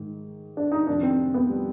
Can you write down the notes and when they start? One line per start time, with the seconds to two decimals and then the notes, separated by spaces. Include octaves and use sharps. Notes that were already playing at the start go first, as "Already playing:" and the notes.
Already playing: G#2 D#3
0.57 D4
0.72 D#4
0.87 F2 C3 D#3 D4
1.03 C4
1.34 B3
1.49 G3